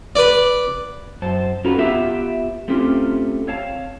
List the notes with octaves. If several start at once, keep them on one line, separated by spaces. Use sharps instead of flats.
B4 D5
F#2 C5 A5
C#4 F4 F#4 A4 B4 A#5
B3 F4 G4 B4 E5
A3 C4 C#4 F4 G4
C4 C#5 F5 A5